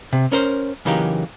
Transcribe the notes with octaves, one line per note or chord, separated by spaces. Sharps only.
C3
C#4 A#4 C5
C#3 E3 F#3 A#3 D#4 G4